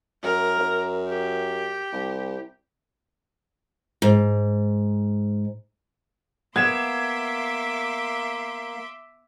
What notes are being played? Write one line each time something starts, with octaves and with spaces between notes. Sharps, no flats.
F#2 A#4
F#2
G4
C2
G#2
A#3 B3 E5 C6 D6 G#6 E7